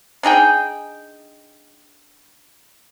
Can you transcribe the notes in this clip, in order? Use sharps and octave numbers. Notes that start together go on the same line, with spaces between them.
D4 D#4 G#4 G5